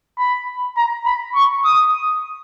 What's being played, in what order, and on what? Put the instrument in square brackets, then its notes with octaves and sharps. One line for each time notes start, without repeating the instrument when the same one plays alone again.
[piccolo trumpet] B5
A#5
B5
C#6
D#6